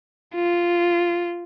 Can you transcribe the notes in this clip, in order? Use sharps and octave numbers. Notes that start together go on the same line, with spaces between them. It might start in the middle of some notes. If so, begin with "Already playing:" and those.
F4